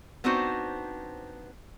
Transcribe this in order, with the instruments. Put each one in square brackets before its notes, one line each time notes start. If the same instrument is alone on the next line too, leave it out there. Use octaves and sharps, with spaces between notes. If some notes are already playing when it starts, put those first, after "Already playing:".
[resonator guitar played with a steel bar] B3 C4 D4 D#4 F#4 C5